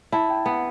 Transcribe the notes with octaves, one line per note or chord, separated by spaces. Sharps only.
E4 A5
G5
B3 F#5